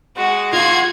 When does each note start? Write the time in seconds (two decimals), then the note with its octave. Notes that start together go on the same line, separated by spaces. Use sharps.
0.16 G#3 F#4
0.53 F4 F#5 C6 G#6